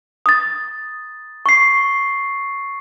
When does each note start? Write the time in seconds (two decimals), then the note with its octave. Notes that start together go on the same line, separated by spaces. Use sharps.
0.26 D#6 A6
1.46 C#6 C7